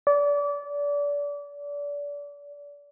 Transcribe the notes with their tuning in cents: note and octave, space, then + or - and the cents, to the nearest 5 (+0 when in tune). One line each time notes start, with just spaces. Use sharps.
D5 -30